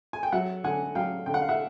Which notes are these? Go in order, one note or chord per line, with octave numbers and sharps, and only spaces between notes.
G#5
G5
F#3 E5 F#5
D3 F#5 G#5
F#3 F5 G5
D3 G5
F#5
F5
E5 F#5